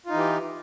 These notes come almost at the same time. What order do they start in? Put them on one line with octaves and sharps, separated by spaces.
F4 D#4 E3 G4